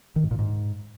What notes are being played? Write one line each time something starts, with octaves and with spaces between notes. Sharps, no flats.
D#3
G#2
A#2
G#2